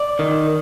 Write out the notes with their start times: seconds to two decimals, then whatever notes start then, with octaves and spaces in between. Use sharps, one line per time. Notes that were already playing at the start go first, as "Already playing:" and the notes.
Already playing: D5
0.19 D#3